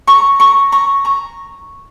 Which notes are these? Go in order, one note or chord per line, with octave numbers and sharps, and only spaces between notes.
A#5 C#6
A#5 C#6
A#5 C#6
A#5 C#6